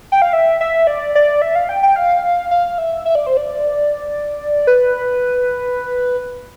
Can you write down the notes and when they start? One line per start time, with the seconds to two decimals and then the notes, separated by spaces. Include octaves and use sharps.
0.12 G5
0.22 F5
0.33 E5
0.61 E5
0.87 D5
1.15 D5
1.42 E5
1.55 F5
1.69 G5
1.83 G5
1.96 F5
2.51 F5
2.78 E5
3.06 E5
3.15 D5
3.26 C5
3.37 D5
4.67 B4